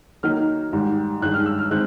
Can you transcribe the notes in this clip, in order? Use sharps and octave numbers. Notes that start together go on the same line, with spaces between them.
D#3 F#3 A#3 D#4 F6
G#2 D#3 G3
G2 D#3 G#3 F#6
F6
E6
F6
D#3 G#3 C4 F#6